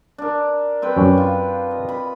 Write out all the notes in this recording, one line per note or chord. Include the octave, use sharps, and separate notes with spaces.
D4 A#4
C4 B4 G5
F#2 C#4
F4
D#5
B5